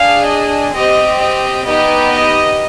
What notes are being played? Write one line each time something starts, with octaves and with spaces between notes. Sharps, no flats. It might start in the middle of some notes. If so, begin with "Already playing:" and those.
Already playing: D4 G#4 F5
D#5
C4 G4 D#5
D#5
B3 D#4 G4 D#5
D#5